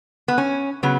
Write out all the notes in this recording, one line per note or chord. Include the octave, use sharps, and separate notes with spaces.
B3
C#4
C#3 F#3 B3